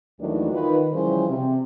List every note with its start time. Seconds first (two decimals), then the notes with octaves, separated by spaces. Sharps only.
0.19 D#2 D#3 E3 F#3 A3 D4
0.52 D#3 F4 B4
0.92 C#3 E3 F3 G3 F4 C5
1.28 C3